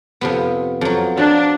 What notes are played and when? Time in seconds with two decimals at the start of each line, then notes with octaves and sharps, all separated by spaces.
0.21 F2 C3 B3
0.81 F2 F#3
1.17 F3 F#3 D4